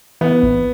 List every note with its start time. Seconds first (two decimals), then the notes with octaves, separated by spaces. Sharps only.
0.21 E3 B3
0.43 A#1